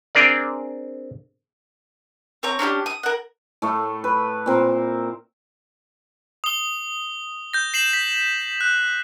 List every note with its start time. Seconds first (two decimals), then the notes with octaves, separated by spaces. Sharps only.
0.15 C4 D4 G#4 A#4 D5
2.43 C4 C#5 A#5
2.59 C#4 D4 E4 G4
2.86 D#6
3.03 A#4 F#5
3.62 A2 A3
4.04 B4
4.46 A#2 C4 A#4
6.44 D#6 G7
7.53 G6 A#6
7.74 C7 E7 F#7
7.93 B6
8.61 F#6